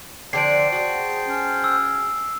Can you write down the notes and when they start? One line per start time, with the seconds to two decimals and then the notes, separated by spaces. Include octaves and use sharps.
0.33 D3 F3 D4 C5 G5 A5 C7 D7
0.72 F#4 G#4
1.27 C#4
1.64 E6